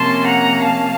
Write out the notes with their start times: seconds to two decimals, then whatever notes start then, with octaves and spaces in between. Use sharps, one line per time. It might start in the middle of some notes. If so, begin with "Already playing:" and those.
Already playing: C3 F3 A#3 C#4 A5 C6
0.25 F#5 A#5
0.62 F5 A5